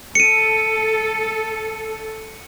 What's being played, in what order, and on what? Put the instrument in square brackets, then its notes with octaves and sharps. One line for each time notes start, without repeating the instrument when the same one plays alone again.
[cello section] A4 [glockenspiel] C#7 D#7